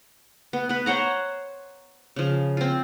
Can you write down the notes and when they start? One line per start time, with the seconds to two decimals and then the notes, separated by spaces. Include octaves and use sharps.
0.53 B3
0.69 B3 B4
0.86 C5 C#5 F#5 A#5
2.16 C#3 F3
2.57 C4 F4